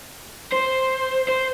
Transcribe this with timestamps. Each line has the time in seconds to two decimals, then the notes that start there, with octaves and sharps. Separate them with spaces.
0.52 C5
1.29 C5